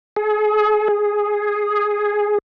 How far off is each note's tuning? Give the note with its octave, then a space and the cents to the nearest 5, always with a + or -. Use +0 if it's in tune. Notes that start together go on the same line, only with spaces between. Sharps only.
G#4 +35
G#4 +0